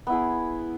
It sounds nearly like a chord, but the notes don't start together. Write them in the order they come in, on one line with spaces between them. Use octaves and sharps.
B3 E4 G#4